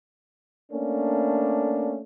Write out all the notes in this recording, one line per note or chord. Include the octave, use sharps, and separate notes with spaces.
A3 A#3 C#4 D4